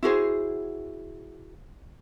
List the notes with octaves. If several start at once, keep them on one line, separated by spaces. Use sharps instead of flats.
E4 F#4 G#4 C5